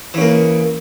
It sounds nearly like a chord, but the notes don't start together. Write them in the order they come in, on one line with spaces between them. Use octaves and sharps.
E3 C#3 A#3